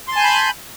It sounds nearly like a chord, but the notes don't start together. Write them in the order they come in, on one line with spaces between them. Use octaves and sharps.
C6 A5 G#5 G6 B5